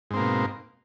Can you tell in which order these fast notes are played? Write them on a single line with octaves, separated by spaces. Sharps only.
G#2 C4 A#3 B2